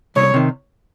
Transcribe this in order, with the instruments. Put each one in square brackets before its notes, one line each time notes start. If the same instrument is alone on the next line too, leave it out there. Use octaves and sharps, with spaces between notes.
[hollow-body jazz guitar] C2 [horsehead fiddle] C#5
[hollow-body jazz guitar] C3 D#3